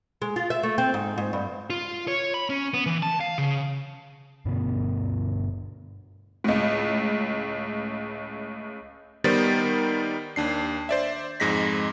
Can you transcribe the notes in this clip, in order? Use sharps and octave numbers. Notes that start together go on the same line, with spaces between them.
G#3
F4
E5
A3
C4
G#2
G#2
G2
F4
C#5
B5
C#4
B3
E3
A5
F5
C#3
G2 B2 D3 B3
C#2 A2
D#3 G3 B3 D#4 C5 A6
D#2 D4 C7
C5 D5 E5
F2 G#2 G#3 A#6 B6